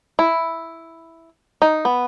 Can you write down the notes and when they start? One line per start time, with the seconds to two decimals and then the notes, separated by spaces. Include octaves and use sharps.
0.19 E4
1.62 D#4
1.85 B3